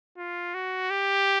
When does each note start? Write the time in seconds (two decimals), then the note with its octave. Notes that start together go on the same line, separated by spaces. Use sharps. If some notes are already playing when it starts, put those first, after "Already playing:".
0.18 F4
0.54 F#4
0.90 G4